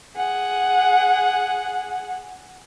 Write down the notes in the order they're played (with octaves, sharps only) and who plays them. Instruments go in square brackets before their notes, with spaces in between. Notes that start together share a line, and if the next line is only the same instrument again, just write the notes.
[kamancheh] G#4 F#5